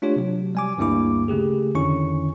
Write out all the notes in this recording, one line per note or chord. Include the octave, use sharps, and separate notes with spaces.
A3 D4 F4 G4 C#5
C3 F#3
G3 G#5 D6
D2 G2 G3 A#3 E4 D6
C#3 A3 G4 G#4
F2 D3 D#3 C#4 E4 C#6